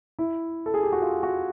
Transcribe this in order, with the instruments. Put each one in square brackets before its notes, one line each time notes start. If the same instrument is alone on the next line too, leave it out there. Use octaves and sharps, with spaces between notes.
[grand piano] E4
A4
G#4
G4
F#4
F4
F#4